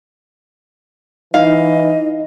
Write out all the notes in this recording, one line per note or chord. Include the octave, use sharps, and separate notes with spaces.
E3 D#4 D#5 F5